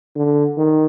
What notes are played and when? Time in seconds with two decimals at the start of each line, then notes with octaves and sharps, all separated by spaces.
0.16 D3
0.58 D#3